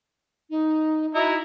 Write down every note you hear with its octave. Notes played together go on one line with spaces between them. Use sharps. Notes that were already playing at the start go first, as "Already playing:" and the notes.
D#4
D#4 E4 F#4 A#5